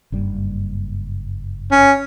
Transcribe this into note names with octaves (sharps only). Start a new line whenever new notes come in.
F#1 G2 G3
C#4